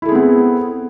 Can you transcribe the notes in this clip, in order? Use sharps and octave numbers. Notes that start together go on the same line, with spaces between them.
B3 C4 E4 G#4 A4